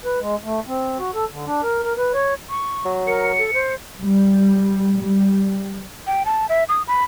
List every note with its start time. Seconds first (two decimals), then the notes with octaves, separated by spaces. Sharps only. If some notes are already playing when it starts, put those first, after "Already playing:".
0.05 B4
0.20 G#3
0.44 A3
0.67 C4
0.99 F#4
1.14 A4
1.32 D3
1.46 D4
1.63 A#4
1.84 A#4
1.97 B4
2.14 C#5
2.50 C#6
2.85 F#3
3.07 A#4 C#7
3.38 A4
3.53 C5
4.01 G3
5.00 G3
6.07 G5
6.25 A5
6.49 E5
6.69 D#6
6.88 B5